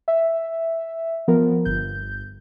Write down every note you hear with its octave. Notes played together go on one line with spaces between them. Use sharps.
E5
F3 B3 A#4
G1 G6